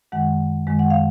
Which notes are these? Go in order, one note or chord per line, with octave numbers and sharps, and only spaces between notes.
F#2 D#3 G#3 F#5
F#2 D#3 G#3
F#5
F5